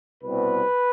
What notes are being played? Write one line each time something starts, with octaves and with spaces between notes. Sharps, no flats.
C2 B2 G3 C4 B4